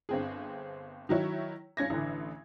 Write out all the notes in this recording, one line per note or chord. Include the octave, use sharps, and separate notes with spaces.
G1 C4 G#4
D#3 F#3 E4 C#5
G2 C#4 G#6 A#6
A1 D3 E3